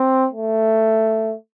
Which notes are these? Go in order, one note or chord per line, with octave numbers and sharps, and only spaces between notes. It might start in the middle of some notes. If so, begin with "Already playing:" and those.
Already playing: C4
A3